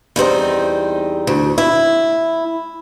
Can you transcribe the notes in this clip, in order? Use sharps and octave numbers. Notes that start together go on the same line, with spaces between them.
E2 G3 C4 D#4
D2
E4